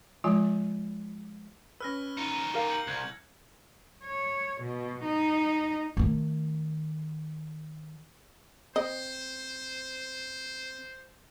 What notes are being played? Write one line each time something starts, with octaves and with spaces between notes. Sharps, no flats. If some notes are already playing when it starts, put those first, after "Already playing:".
F3 G#3 F4 G#5
C#4 B4 E6 F6 A#6
D#4 F4
G4 A#4 F5
G6 C#7 F#7
C2 F#6 G#6
C#5
B2
D#4
D#3 A3
C4 C5 D#5